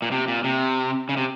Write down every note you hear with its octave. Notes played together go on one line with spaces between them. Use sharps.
A#2
C3
A#2
C3
C#3
C3